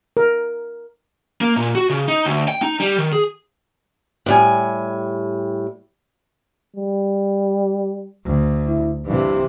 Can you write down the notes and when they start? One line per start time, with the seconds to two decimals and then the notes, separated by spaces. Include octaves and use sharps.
0.17 A#4
1.41 A#3
1.56 A#2
1.75 F#4
1.90 C#3
2.08 D#4
2.25 D2
2.48 G5
2.62 D#4
2.80 G3
2.98 D#3
3.13 G#4
4.26 A2 G3 G#5
6.76 G3
8.26 D2
8.68 E4
9.06 G2 C3 E3